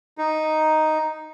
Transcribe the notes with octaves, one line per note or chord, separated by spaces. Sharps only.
D#4